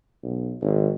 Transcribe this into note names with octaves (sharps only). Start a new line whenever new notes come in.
B1
G#1